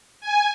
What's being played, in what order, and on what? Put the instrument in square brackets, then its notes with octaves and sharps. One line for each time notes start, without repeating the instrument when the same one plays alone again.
[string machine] G#5